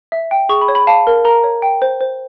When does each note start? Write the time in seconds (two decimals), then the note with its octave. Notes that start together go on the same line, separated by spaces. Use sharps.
0.12 E5
0.31 G5
0.49 G#4 C#6
0.61 B5
0.68 C#5
0.75 B5
0.87 F5 A5
1.07 A#4
1.25 A#4 A#5
1.44 C#5
1.62 G5
1.82 C5
2.01 C5